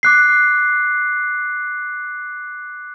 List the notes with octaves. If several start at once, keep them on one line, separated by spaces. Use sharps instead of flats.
D6 F#6 C7